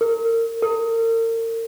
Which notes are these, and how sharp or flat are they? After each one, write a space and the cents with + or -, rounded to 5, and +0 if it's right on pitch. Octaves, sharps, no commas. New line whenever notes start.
A#4 -30
A#4 -40